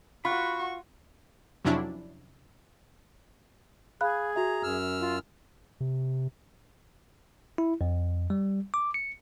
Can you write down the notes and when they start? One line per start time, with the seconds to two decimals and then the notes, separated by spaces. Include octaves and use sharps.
0.25 F4 F#4 F#5 B5 C#6
1.65 F2 C3 F#3 C#4 D4 E4
4.01 G#4 F5 B5 F#6
4.36 F#4 E5 A#5
4.63 F#2 E6 F6
5.00 F4
5.80 C3
7.58 E4
7.81 F2
8.30 G3
8.74 D6
8.94 C#7